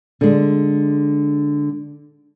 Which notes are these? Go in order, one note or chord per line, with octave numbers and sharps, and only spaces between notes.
D3 G#3